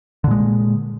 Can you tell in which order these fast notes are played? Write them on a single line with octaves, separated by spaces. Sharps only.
D3 A#2 G#3